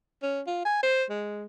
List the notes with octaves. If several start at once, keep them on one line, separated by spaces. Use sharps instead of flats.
C#4
F4
G#5
C5
G#3